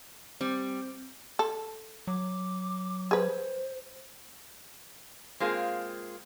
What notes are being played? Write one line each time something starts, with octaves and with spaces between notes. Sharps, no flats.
G3 C4
A4
F#3 D6
G#4 B4 C5
G#3 A#3 C4 F4 G#4